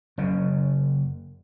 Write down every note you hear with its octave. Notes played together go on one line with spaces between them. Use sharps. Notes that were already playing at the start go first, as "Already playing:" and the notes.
F#1 F#2 C#3